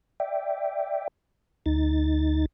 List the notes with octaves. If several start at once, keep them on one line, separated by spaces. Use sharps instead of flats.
D5 E5 G5
D2 D#4 A6